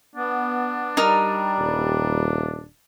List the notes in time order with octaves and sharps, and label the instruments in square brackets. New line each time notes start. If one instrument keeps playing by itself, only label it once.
[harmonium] B3 [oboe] D4
[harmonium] G3 [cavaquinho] D#4 A#4
[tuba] D#1